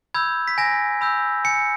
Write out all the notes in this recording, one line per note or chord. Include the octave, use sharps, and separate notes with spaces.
B5 E6 G6 G#6
B6
G#5 A#6
B5 E6 G6
G#5 C#7